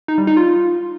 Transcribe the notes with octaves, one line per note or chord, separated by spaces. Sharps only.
D#4
G3
D#4
F4